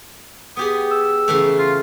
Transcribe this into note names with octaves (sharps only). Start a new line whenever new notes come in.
B3 G4 G#4 D#6
E6
C#3 E3 A3
F4